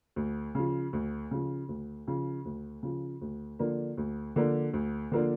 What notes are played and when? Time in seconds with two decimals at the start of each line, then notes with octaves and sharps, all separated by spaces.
0.16 D2
0.55 C#3 F3
0.93 D2
1.31 C#3 F3
1.69 D2
2.07 C#3 F3
2.45 D2
2.83 C#3 F3
3.21 D2
3.59 D3 F3 A#3 D4
3.97 D2
4.36 D3 F3 A#3 D4
4.73 D2
5.12 D3 F3 A#3 D4